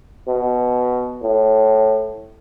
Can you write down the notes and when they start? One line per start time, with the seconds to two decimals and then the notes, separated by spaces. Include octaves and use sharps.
0.28 B2
1.22 A2